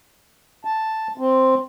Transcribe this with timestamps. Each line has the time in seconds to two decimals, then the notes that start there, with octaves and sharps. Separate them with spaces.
0.65 A5
1.18 C4